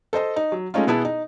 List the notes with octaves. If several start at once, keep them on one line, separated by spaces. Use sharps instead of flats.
A4 C5 D#5 A5
D#4
F#3
G#3 A3 C#4 D#4 F4
B2 B3 E4 G#4 A5
D#4